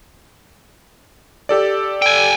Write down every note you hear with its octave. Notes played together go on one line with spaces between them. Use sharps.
G4 A4 D5
G5 G#5